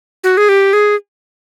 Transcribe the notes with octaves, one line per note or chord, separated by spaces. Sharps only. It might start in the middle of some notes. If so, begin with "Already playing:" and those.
F#4
G#4
G4
G#4